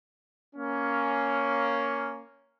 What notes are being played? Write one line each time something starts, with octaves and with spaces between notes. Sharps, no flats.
A#3 C#4